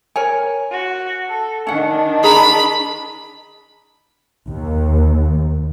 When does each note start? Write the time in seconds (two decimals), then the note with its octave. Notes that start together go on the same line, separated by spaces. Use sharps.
0.16 A#4 C#5 G#5
0.70 F#4
1.28 A4
1.67 D#3 C#4 D4 F#5
2.24 G#4 A#5 B5
4.47 D#2